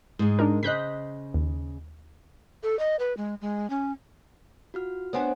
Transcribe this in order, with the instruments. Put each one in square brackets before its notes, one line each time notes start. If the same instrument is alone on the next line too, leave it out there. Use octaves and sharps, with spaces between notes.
[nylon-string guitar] G#2 G#3
[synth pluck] D4 D#4 A#4
[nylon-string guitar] C#3 C5 D#5 [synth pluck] F#6 G6 B6
[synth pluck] D#2
[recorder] A4
D#5
B4
G#3
G#3
C#4
[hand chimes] F4 F#4 F6
[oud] B3 C4 D4 [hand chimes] C#5 F#5 G#5